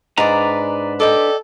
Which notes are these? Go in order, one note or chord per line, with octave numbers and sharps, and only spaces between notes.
G#2 D4 G#4 B4 D5 A#5
A4 D5 D#5 G5